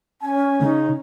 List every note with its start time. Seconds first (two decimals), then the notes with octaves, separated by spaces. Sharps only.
0.22 C#4 G#5
0.60 C#3 D#4